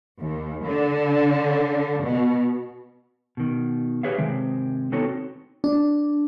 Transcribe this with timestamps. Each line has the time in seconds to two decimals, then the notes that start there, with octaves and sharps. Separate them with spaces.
0.20 D#2
0.65 D3
2.04 B2
3.37 B2 D#3
4.03 G4 G#4 B4 C#5 E5 F5
4.18 C3 D#3 G#3 C4
4.92 B3 C4 D#4 F#4 A4 C#5
5.64 D4